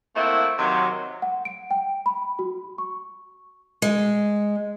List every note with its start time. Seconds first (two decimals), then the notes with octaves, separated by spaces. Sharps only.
0.16 A3 A#3 C4 E4 F#5
0.58 C3 D#3 F#3
1.22 F#5
1.45 D7
1.71 G5
2.06 B5
2.39 F#4
2.78 C#6
3.82 G#3